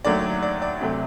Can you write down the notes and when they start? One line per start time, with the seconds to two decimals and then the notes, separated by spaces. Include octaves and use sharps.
0.04 D#2 D3 F#3 A3 D5
0.43 D5
0.62 D5
0.80 D2 C3 F#3 A3